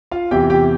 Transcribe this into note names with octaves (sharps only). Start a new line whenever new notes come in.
F4 F5
E2 C3 E3 G4 G5
G4 G5